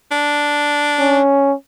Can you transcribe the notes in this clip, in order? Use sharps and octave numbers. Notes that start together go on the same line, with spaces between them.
D4
C#4